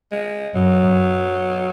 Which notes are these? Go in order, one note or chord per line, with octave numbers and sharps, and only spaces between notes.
G#3
F#2 F#3
F#2